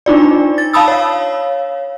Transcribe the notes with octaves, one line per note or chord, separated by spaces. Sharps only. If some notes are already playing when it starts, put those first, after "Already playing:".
D4 D#4 F4 D5
A6
F5 A5 B5 D#6 E6
C#5 F5